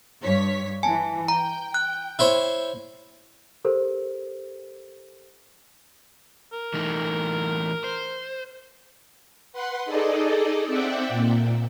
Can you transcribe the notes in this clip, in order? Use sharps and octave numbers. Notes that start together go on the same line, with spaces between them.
G2 C#5 B6
E3 G#5 A5
G5 A#5
F#6
E4 C5 C#5
G4 A4 A#4 C5
A#4
E3 A3 D#4
C5
B4 F#5 C6
D#4 G#4 A4 D5 D#5
C4 D5 E5 F#5 G5
A#2